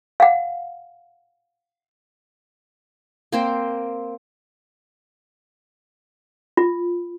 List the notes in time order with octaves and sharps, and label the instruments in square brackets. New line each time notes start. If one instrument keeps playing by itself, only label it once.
[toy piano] F5 F#5
[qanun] A#3 C4 C5
[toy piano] F4